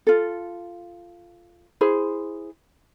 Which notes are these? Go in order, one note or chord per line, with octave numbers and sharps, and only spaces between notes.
F4 A4
E4 G#4 C5